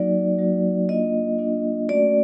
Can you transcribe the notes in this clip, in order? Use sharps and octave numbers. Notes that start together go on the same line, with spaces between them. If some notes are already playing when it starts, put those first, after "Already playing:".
Already playing: F#3 A#3 D#4 F#4 D5
F#3 A#3 D#4 F#4
A#3 D4 F4 D#5
A#3 D4 F4
A3 C#4 F#4 D5